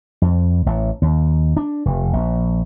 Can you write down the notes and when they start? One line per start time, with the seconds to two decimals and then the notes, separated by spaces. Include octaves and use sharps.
0.22 F2
0.66 A1
1.02 D#2
1.57 D4
1.86 F1
2.13 A#1